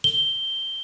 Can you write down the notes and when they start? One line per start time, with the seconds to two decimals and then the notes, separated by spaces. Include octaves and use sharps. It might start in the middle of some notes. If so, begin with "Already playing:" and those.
0.04 G7